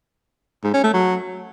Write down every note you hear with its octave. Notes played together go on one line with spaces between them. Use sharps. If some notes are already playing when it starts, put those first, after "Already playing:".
G#2
C#4
A3
F#3